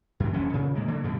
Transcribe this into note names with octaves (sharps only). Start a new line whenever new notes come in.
F#2 E3
E1 A#1 D3 C#4
A#2 C#3
C3 D#3 G#3 A#3
D3 E3 F#3 A#3
D2 G2 B2 G3